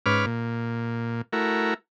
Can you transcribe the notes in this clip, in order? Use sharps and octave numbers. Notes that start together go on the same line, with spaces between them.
G#2 C#4 B4 D6 F6
A#2
A3 E4 F#4 A#4